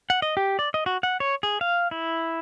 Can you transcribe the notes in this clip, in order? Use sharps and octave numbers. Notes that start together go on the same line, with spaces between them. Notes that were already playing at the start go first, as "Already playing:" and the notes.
F#5
D#5
G4
D5
D#5
F#4
F#5
C#5
G#4
F5
E4